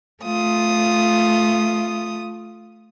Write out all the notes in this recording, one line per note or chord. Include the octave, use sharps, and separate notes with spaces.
A3 F4 D#6